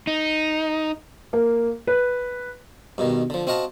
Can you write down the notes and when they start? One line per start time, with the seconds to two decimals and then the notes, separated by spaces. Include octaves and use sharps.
0.07 D#4
1.33 A#3
1.87 B4
2.98 G2 B2 D#3
3.30 D3 F3
3.47 C4 F#4 D#5 F5 A5